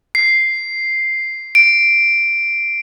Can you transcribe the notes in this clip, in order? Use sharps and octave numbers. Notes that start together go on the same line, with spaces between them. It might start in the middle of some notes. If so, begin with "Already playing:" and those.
C7
D7